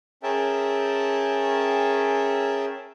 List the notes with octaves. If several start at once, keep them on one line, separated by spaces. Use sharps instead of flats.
C#4 G#4 A#4 E5 G5 A5